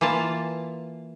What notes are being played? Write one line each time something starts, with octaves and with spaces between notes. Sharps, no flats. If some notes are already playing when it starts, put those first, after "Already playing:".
E3 A#3 F4 A5